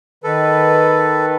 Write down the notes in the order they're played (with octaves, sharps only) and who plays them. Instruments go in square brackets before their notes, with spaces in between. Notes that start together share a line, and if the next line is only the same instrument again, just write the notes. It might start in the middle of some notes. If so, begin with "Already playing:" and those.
[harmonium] D#3 B4 [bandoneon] A4